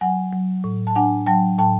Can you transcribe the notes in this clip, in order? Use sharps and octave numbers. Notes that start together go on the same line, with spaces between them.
F#3 F#5 G#5
F#3
A2
A5
D4 F#5 G#5
F#3 G5 A5
A2 G5 A5